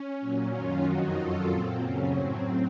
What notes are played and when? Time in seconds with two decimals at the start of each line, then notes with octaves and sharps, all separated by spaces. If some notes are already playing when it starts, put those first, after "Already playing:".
Already playing: C#4
0.19 A#2 F#3
0.52 F#2 D#3 F#3 C#4 F4
0.84 F2 D#3 F#3 D#4 F#4
1.16 F#2 D#3 F#3 F4 A4
1.48 A#2 F#3 C4
1.80 F#2 C#3 F#3 C#4
2.13 A2 F#3 C4